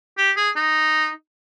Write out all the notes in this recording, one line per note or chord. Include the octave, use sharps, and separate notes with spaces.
G4
G#4
D#4